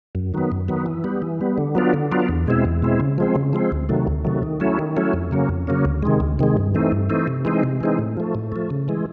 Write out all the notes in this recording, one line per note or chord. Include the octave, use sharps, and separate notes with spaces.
F#2
D#3 F#3 B3
F#2
D#3 F#3 B3
E3
G3 B3
E3
G3 B3
D3
F#3 B3 D4 F4
D3
F#3 B3 D4 F4
E2
B2 G#3 C4 E4
E2
B2 G#3 C4 E4
C#3
F3 G#3 C4
C#3
F3 G#3 C4
D2
C3 D#3 F#3 A3
D2
C3 D#3 F#3 A3
D#3
F#3 A3 C#4 E4
D#3
F#3 A3 C#4 E4
F2
C#3 F#3 A#3 C#4
F2
C#3 F#3 A#3 C#4
D2
C3 D#3 G#3
D2
C3 D#3 G#3
G2
E3 A3 C4 D#4
G2
E3 A3 C4 D#4
C3
E3 G#3 C4 D#4
C3
E3 G#3 C4 D#4
A2
F3 A3
A2
F3 A3
C#3
E3 G#3